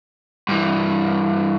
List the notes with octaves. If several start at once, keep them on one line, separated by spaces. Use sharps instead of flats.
G2 E3